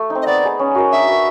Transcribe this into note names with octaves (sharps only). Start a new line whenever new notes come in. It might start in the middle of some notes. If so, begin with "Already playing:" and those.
Already playing: A3
D#4
C4
D#5
B3 D5
D#4 G#4
C#4
F#4 A#4 D#5
D4 E5
F#4 B4